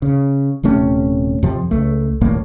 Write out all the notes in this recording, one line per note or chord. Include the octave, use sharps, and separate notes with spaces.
C#3
D#1 C3 A3 C#4
F2 C3 F3
C#2 A3
D#1 G#1 A2 A#3